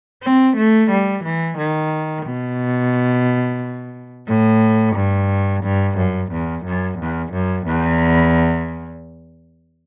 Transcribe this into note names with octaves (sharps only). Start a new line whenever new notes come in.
C4
A3
G3
E3
D#3
B2
A2
G2
G2
F#2
E2
F#2
E2
F#2
E2